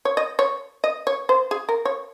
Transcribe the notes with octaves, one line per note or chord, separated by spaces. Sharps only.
C#5
D#5
C#5
D#5
C#5
C5
G#4
A#4
C#5